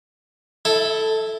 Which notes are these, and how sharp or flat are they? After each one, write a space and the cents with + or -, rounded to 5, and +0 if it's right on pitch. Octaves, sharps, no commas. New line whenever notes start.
E4 +0 A4 +0 E5 -45